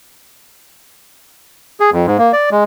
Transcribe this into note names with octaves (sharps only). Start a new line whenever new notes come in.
G#4
F2
G#2
A#3
D5
G#3